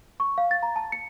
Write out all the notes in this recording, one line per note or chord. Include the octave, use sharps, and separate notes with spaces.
C#6
F5
A6
A#5
A5
C#7